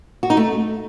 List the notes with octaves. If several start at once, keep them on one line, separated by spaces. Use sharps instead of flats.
F#4
D#4
A3